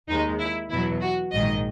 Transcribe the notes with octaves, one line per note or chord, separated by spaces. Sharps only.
D#2 D#3 G#3 D#4
E4
E2 B2 F#3 E4
F#4
A#1 G#2 D#3 D#5